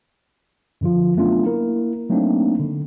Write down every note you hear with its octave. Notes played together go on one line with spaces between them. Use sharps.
F#2 D3 F3 F4
F#3 A3 B3 C#4 D4 F4
A#3 E4 A#4
F#3 A3 A#3 C4 D4 D#4
D3